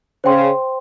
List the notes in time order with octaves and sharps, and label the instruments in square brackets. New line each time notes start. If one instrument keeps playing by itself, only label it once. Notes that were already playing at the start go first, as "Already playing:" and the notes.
[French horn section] C#3 [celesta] C5 G5 C6